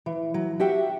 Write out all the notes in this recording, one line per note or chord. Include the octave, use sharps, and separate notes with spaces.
E3
F#3
F#4 G4 E5 F#5 G5